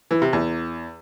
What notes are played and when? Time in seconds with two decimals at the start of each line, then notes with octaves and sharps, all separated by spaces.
0.11 E3
0.22 C3
0.33 E2